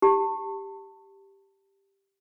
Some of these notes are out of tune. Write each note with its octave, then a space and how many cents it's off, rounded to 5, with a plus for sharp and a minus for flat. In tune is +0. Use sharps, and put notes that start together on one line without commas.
G4 +0 A5 +25